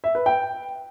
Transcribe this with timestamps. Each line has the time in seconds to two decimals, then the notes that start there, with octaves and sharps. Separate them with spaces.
0.04 E5
0.15 B4
0.26 G5